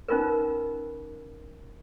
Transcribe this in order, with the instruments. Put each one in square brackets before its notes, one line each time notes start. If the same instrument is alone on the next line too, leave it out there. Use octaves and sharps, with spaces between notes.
[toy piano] C#4 D#4 F4 A#4 B4